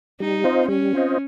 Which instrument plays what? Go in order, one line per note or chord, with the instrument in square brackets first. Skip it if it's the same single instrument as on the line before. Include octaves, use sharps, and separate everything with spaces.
[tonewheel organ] G3 [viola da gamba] D#4
[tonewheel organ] C4 F4 C5 D#5
[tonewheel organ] G3 [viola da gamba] C#4
[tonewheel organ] C4 F4 C5 D#5